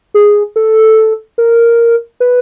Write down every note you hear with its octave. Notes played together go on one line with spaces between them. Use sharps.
G#4
A4
A#4
B4